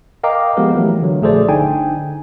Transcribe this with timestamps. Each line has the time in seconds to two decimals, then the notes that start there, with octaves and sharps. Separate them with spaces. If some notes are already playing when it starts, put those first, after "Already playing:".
0.24 A#4 D#5 F5 G5 A#5 D6
0.57 F3 G#3 B3 G4 A#4
0.74 E3 F#3 A3
1.02 D3 F#3
1.22 A#1 A3 G#4 A4 C5 D5
1.48 G1 D3 D#4 G5 G#5